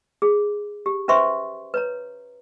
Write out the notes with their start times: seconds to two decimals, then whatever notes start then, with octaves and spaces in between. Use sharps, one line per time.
0.22 G#4
0.86 G4
1.08 C#4 B4 C5 E5 C6 C#6
1.74 B4 C#5 A#5